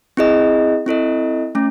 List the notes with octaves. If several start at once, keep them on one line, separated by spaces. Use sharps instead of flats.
C4 E4 G#4 D#5
C4 E4 A4 D#5
A3 C#4